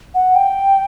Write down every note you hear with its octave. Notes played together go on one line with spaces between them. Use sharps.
F#5
G5